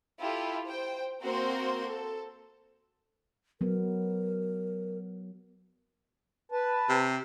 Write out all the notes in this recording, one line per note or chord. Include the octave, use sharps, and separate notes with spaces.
E4 F4 G4 A4
C5 G5
A#3 C4 F#4 A#4 C5 C6
A4
F#3 B3 A#4
B4 A5
C3